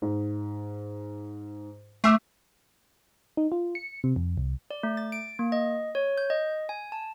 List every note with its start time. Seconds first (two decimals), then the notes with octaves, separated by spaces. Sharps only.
0.02 G#2
2.04 A3 D6 E6 C7
3.37 D#4
3.52 F4
3.75 C#7
4.04 C3
4.16 F2
4.37 C2
4.71 D5
4.83 A3
4.97 A6
5.12 D7
5.39 A#3
5.52 D#5
5.95 C#5
6.18 G6
6.30 D#5
6.69 G#5
6.92 A5